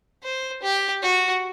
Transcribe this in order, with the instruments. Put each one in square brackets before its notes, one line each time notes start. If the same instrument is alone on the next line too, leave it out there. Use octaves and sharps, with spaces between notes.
[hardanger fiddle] C5
G4
F#4